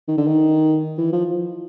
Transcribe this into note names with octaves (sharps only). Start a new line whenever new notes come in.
D#3
D3
D#3
E3
F3